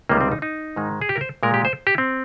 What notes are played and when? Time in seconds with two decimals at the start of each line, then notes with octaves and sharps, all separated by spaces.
0.09 C#2 C3 D#3 G3 A#3
0.21 C4
0.32 D#4
0.42 D#4
0.76 G#2 D#3 G#3
1.01 G#4
1.09 G4
1.16 A#4
1.21 C5
1.43 A#2 G#3 A#4
1.54 G4
1.65 C5
1.87 G4
1.98 C4